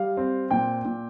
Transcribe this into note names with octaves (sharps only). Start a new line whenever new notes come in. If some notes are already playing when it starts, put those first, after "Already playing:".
Already playing: G3 F5
C4
A#2 G5
A#2